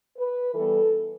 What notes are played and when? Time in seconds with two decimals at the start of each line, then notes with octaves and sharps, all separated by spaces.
0.17 B4
0.54 E3 G3 B3 A4